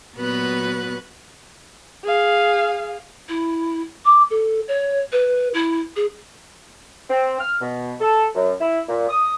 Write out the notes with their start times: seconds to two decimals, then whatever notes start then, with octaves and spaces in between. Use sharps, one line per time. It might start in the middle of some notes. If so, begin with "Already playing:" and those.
0.16 A#2 F#3 B3 F#4 B4 F#6
2.04 G#4 F5
3.28 E4
4.04 D6
4.30 A4
4.68 C#5
5.12 B4
5.53 E4
5.96 G#4
7.10 C4
7.40 F6
7.61 B2
8.00 A4
8.35 F#2
8.61 E4
8.88 A#2
9.09 D#6